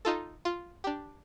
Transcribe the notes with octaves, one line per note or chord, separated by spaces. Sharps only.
D#4 F4 A4
F4
D4 G4